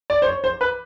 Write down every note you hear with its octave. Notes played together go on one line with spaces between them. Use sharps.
D5
C5
C#5
C5
B4